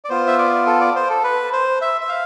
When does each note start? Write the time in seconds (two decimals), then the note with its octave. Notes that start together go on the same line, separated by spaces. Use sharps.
0.05 D5
0.10 B3 F4 C5
0.27 E5
0.38 D5
0.67 A4
0.80 D5
0.96 C5
1.10 A4
1.24 B4
1.53 C5
1.81 E5
2.01 E5
2.09 F5